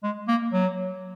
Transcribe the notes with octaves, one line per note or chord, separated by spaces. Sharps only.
G#3
A#3
F#3